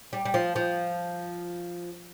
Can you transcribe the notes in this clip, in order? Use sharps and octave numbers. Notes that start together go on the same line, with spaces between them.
G3
G3
F3
F3